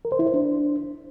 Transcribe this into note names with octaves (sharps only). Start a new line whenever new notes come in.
A#4
C5
E4
C5
D4